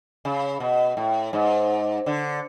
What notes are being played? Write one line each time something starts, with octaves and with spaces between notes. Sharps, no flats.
C#3
B2
A2
G#2
D3